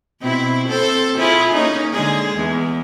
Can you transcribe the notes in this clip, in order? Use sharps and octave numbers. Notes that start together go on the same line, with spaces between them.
B2 C4 E4
C4 A4 C5
E4 F4 G#4
A#3 C#4 D#4
D3 G#3 G#4
E2